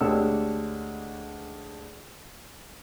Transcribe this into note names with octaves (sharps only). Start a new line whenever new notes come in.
D2 G#3 D4 G4 C#5 E6